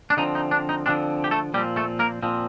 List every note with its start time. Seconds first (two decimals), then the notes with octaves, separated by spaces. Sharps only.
0.10 D4
0.17 D3 F3 C4 D#4
0.35 D#4
0.51 D4
0.69 D#4
0.86 D3 F3 C4 D4
1.24 G4
1.31 A3 A4
1.54 A#2 F3 G3 C4 G4
1.76 A3 A4
1.99 A#3 A#4
2.22 A#2 F3 C4